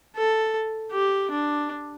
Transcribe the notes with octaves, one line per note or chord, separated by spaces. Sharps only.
A4
G4
D4